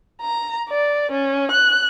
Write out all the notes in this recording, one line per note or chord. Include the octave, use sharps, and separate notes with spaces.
A#5
D5
C#4
F#6